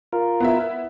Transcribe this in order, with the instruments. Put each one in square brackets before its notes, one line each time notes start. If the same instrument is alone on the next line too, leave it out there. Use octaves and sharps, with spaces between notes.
[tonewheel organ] F4 A#4
[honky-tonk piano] B3 E4 E5